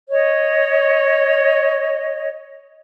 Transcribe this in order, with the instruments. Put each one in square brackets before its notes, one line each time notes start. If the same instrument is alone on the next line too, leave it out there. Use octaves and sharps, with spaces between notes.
[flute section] C#5 D#5